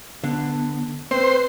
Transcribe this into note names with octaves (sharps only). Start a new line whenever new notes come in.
D3 B3
C4 B4 C5